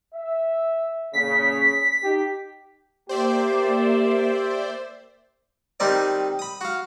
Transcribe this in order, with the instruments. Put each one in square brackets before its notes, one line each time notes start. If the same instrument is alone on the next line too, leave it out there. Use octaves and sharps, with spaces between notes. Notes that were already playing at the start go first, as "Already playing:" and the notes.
[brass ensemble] E5
[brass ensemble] A#2 C#3 [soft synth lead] B6
[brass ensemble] D#4 G4
[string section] A#3 [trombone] G4 [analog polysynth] C5 D5 E5
[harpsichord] D#3 G3 C4 D#4 D5 D#5
B5 D#6
F#4 F5